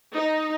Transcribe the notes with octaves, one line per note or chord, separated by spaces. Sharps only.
D#4